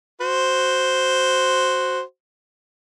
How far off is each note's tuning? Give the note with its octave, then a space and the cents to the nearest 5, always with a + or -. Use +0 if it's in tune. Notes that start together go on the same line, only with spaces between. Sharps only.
F#4 +0 C5 +0